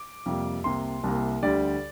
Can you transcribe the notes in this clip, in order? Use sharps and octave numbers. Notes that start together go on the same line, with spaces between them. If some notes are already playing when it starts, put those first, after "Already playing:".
Already playing: D6
F2 C3 G3 A#3
C2 C3 A#3 C6
C2 C3 A#3
D2 D3 G3 D5